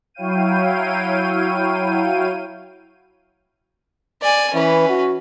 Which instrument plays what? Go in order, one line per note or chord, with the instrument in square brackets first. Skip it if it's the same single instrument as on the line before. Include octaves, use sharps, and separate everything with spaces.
[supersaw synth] F#3 E4 C#5 F5 G5 D#7
[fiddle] D5 G#5
[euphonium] E3 [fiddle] C#4 B4
[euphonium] F#4